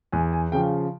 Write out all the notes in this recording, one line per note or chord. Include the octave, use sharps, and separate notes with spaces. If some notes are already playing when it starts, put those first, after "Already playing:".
E2 G#5
G#5
C#3 F3 G5